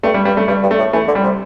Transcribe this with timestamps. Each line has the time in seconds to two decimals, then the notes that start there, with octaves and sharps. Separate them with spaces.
0.03 G2 A3
0.14 G3
0.25 G2 G3
0.37 A3
0.48 G2 G3
0.63 G2
0.71 A3
0.79 A2
0.93 E3 A3
1.08 D3
1.15 G3
1.24 C3